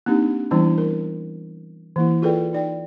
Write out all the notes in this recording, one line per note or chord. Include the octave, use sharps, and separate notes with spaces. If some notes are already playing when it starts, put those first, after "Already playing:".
A#3 C4 D4 D#4 G4
E3 G3 B3 C#4 D4 E4
A#4
E3 A#3 E4
F4 G#4 A4 B4 D5 G5
D#4 D5 G5